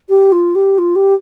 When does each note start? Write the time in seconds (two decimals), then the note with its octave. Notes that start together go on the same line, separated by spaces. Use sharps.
0.09 G4
0.32 F4
0.55 G4
0.78 F4
0.95 G4